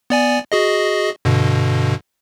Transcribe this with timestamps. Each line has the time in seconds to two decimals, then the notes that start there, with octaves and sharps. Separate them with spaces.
0.10 B3 D5 G#5
0.52 F#4 G#4 D#5
1.25 G2 B2 D3